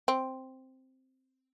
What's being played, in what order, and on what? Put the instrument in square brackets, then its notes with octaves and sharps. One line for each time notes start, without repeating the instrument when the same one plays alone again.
[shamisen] C4